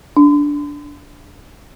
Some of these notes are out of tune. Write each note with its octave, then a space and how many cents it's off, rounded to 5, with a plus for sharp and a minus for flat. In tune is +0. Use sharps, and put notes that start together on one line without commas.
D4 -10